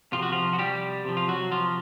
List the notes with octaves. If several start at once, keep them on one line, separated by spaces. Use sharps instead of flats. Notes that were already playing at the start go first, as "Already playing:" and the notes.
C3 F3 F4
F#4
F3 F4
F#4
G3 G4
C3 F3
F4
F#3 F#4
F3 F4